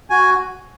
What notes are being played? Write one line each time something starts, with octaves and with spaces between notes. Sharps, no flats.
F#4 G#5